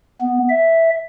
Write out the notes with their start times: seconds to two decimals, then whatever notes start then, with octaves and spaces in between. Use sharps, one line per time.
0.21 B3
0.50 E5